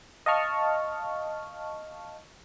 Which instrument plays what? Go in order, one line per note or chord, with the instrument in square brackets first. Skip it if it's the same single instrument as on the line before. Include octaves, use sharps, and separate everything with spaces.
[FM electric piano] D#5 F5 A5 C#6 F6